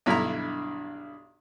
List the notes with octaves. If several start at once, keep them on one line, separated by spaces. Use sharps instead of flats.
B1 G2 D3 E4 A#5